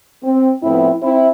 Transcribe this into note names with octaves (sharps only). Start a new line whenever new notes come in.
C4
A2 F3 B3 C4 E4
C4 E4